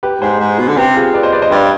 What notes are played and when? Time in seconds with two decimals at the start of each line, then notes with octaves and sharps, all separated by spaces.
0.03 G4 B4
0.21 G#2 G#4 C5
0.40 G#2
0.59 B2
0.68 D3
0.77 C3 G4 B4
0.96 F4 G#4
1.14 B4 D5
1.23 C5 D#5
1.32 B4 D5
1.42 C5 D#5
1.51 G2 B4 D5